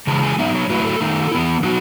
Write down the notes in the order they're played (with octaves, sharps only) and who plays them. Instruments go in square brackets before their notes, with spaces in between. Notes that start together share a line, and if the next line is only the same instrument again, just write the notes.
[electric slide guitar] C#3 E3 G#3 A5
G#5
F#3 B3 D#4 E5
C#5
F#3 A3 E4 B4
A4
D#3 A3 D#4
E3 B3 E4
F#3 B3 D#4 F#4